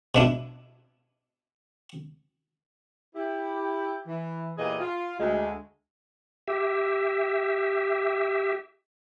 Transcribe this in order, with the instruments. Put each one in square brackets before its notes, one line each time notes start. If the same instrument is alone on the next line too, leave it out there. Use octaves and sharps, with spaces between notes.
[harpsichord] B2 D4 E4
[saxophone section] E4 G4
E3
E2 A#2 E3 G4 G#4 D#5
F4
D2 G#3
[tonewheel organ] G4 E5